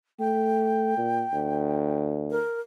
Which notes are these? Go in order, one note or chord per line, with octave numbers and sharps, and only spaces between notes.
A3 G5
A#2
D2
A#4